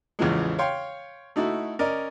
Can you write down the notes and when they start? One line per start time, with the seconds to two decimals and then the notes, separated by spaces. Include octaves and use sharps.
0.19 A1 E2 C#3 E3 F3 G#3
0.58 C#5 F5 G5 C6
1.36 A3 D#4 E4 F#4
1.79 C#4 A#4 D5 D#5